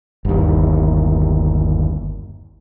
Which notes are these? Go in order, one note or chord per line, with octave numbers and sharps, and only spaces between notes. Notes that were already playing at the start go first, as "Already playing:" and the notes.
G1 D#2